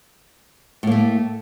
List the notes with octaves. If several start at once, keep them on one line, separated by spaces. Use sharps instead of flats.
A2 A3 A#3